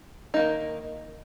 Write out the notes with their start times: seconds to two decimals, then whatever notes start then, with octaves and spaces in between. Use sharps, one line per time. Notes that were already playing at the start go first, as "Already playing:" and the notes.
0.34 D#4
0.37 A#3
0.39 D#3